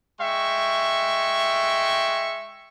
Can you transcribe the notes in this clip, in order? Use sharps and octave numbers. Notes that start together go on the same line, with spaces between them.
G#3 E5 G5 C#6